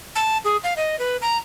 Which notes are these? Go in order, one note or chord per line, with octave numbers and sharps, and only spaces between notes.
A5
G#4
F5
D#5
B4
A#5